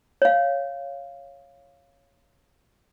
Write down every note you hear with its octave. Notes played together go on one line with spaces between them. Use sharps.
C#5 F5